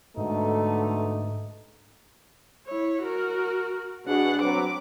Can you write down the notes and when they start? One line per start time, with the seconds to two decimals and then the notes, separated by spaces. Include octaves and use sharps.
0.17 G#2 B2 D3 A3 D#4
2.67 E4 C#5
3.03 F#4 A#4
4.06 B2 D4 F#4 G#4 F#5
4.41 F#3 C4 B4 D6